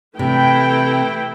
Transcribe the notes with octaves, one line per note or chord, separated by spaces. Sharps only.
C3 E3 A3 E4 G5